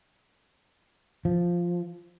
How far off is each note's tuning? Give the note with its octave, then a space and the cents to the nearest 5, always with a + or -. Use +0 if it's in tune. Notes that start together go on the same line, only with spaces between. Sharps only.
F3 +0